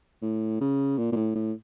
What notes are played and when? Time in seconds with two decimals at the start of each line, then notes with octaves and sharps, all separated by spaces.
0.22 A2
0.61 C#3
0.98 A#2
1.12 A#2
1.16 A2
1.36 A2